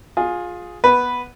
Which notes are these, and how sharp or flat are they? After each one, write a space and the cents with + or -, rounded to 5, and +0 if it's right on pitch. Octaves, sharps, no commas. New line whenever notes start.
F4 +20 G#4 +0
B3 -10 B4 +0